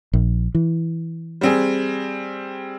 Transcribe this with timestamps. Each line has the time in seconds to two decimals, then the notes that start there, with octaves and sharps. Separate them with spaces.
0.13 A#1
0.55 E3
1.41 G3 C4 G#4